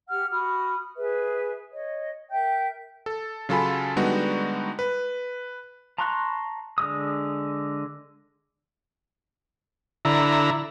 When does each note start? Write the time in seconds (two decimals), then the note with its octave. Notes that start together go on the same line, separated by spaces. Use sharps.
0.08 G4 F#5 F6
0.30 F#4 B5 D#6 F6
0.96 G#4 B4 E5
1.73 C#5 D#5
2.30 A#4 E5 G5 G6
3.06 A4
3.49 C#3 F#3 F4 A4 G#5 B5
3.96 D3 G3 G#3 B3 D#4 F#4
4.79 B4
5.98 A5 A#5 C6 C#6 F#6
6.78 D3 G#3 D#6
10.05 D3 E4 A#5